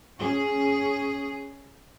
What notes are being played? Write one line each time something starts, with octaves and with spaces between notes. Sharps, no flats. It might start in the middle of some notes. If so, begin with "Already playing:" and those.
C#4 G#4